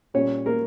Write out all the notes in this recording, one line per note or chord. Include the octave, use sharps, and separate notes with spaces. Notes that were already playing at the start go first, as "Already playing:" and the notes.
A#2 G3 C#4 C#5
A#3 A#4